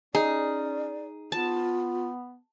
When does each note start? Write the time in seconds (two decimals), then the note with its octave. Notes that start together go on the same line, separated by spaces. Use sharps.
0.15 C#4 D#4 G#4 D5
1.32 B3 F4 A5